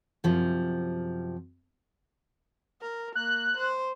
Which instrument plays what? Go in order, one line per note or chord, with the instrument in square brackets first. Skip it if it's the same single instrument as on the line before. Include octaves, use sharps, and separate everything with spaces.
[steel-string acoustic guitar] F#2 C3 F3
[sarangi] A#4
[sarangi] A#3 [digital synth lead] F#6
[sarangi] C5